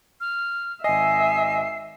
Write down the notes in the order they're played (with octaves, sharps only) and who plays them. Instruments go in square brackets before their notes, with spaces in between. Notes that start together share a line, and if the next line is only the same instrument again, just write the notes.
[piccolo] F6
[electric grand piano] G#1 D#5 [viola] E5 [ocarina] G#5 [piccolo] C7